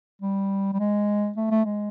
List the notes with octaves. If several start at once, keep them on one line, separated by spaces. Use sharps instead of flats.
G3
G3
G#3
A3
A3
G#3